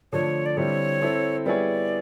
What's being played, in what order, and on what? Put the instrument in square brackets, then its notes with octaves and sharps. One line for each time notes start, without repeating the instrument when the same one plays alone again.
[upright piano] D3 F3 A3 [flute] C#5
[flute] D5
[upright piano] D3 G3 C4 E4 [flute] C#5
[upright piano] C4 E4 A4
[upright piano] G3 B3 E4 G#4 C#5 [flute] D5